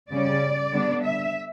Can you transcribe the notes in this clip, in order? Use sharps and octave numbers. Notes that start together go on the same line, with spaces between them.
C#3 G3 C#4 D5
D3 G3 B3 D4
E5